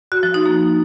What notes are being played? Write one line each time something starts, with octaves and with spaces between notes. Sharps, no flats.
F#4
F3
D#4
A#3